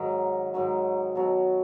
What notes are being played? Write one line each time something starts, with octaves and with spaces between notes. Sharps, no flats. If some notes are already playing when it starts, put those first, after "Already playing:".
Already playing: G#2 D#3 F#3
G#2 D#3 F#3
B2 F#3